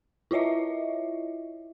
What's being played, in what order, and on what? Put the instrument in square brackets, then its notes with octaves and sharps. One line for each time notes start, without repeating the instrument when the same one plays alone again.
[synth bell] E4 F4 C#5 D#5 E5